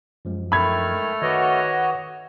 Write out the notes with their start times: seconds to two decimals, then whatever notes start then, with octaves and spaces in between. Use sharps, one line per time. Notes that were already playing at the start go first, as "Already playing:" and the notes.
0.25 F#2 F3 G#3
0.52 D#3 A3 A4 B5 F6 G#6
1.22 D#3 F#4 B4 C#5 D#5 D6